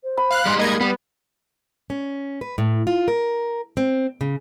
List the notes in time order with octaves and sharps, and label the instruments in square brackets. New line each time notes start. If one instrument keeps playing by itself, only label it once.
[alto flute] C5
[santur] B5
[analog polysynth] F5 F#6
[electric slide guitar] G3 G#3 D#4 [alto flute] C6
[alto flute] A#3 [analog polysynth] D#5 G#6
[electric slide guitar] G3 [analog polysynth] B3
[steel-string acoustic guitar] C#4
B4
A2
F4
A#4
C4
C#3